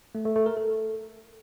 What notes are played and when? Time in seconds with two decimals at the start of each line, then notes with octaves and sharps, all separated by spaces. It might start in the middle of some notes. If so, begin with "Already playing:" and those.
0.15 A3
0.25 A3
0.36 A3
0.46 A#4
0.57 A4